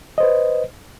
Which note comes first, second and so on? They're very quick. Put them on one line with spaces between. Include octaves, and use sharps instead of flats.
D#5 C5 B4